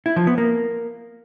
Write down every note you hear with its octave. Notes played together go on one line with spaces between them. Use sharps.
E4
F3
B3
A#3